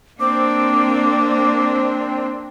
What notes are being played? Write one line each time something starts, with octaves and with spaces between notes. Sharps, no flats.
A#3 C4 D4 D6